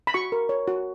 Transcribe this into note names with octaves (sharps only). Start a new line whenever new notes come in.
B5
F#4 C#6
A#4
C#5
F#4